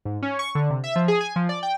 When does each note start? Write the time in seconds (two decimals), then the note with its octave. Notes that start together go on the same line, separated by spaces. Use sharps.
0.05 G#2
0.22 C#4
0.39 C#6
0.55 D3
0.70 C3
0.84 E5
0.96 F3
1.08 G#4
1.20 G#5
1.36 F3
1.49 D5
1.63 G5